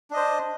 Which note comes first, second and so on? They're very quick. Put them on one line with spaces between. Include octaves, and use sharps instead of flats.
D4 D#5 C5